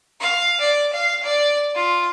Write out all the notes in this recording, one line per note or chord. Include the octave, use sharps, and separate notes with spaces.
F5
D5
F5
D5
F4